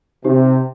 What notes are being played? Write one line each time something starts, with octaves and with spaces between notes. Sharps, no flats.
C3 D#4 G4 C5